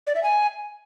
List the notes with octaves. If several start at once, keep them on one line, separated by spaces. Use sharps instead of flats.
D5
E5
G#5